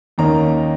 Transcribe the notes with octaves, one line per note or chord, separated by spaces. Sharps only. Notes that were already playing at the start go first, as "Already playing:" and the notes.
D#2 D#3 A#3 C#4 A#5